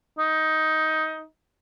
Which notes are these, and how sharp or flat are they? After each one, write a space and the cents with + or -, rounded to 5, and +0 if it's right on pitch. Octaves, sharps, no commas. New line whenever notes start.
D#4 +15